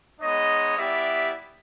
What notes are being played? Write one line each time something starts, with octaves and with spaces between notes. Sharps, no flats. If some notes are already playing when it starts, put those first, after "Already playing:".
G#3 B3 D#4 C#5 D#5
G3 B3 E4 G4 D5 E5